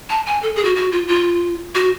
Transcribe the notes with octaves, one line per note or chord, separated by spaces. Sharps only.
A5
G#5
A4
G#4
F#4
F#4
F4
F4
F#4